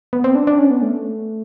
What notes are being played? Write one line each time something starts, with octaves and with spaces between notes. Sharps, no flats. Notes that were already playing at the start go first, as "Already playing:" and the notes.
B3
C4
D4
D4
C#4
B3
A3